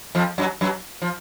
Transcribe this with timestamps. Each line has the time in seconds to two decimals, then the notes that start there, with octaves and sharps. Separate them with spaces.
0.15 F2 F3
0.38 F#2 F#3
0.61 F#2 F#3
1.02 F3